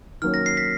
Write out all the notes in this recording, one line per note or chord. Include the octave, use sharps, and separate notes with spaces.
D#3 F#3 A#3 C#4 F6
A#6
C7
B6